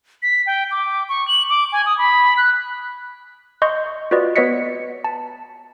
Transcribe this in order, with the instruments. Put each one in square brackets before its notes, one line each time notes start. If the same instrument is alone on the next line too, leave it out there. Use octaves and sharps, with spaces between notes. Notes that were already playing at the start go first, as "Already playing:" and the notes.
[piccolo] B6
G5
D6
C#6
F#7
D6
G#5
D#6
B5
F#6
[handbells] D#5 C6 C#6 G6
F4 F#4 B4 D5 D#5
B3 B4 C#5 D#5 B6 C#7
A5